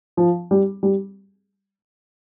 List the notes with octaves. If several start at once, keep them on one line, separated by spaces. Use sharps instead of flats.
F3
G3
G3